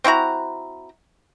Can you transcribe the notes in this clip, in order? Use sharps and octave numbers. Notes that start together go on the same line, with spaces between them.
C4 E4 F#4 A#5